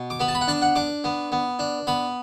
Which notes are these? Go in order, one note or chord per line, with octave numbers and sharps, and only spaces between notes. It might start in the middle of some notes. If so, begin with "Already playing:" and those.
Already playing: B2
D6
B3 B5
A5
B5
F#5
D4 A5
F#5
D4 D6
B3
B3
D4
B3 B5